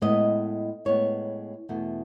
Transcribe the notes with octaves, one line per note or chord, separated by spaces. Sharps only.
A2 G#3 B3 D#5
A2 G#3 B3 C#5
E2 B2 A3